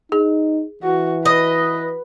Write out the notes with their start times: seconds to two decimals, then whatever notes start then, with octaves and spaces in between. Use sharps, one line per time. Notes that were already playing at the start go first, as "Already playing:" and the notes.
0.12 D#4 G#4
0.83 E3 F#4
1.25 B4 D#5